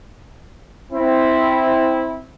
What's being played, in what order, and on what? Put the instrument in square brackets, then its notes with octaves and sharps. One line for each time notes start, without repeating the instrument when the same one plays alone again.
[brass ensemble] C4 E4